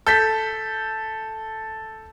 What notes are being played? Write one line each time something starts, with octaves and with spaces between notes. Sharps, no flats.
A4 G6 B6